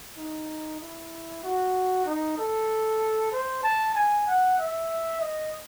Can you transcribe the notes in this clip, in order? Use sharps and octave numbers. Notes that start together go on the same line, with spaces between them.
D#4
E4
F#4
D#4
A4
C5
A5
G#5
F#5
E5
D#5